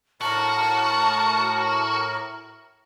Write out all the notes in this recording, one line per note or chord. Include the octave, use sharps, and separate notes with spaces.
A2 F#4 A#4 A5